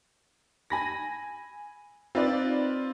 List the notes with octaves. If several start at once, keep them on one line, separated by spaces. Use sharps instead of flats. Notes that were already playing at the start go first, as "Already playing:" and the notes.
G#5 B5 A#6
C4 D#4 F4 B4 D5